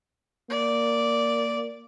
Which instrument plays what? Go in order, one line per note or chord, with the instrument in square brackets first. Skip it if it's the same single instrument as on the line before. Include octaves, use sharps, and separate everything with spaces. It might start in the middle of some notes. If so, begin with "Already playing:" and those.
[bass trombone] A#3 [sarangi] D5